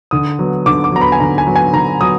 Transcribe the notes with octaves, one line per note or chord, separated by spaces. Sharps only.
D3 D#6
F#3 B3
D3 D6
D6
F#3 B3 A#5
B5
G#5
D3 A#5
G#5
F#3 B3
G#5
D3 A#5
F#3 B3 D#6